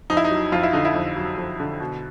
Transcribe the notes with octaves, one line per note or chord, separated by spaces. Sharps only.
F2 D#4
E4
D#4
F#3
F2 F4
E4
D3 D#4
E4
F2
F#3
F2
D3
B2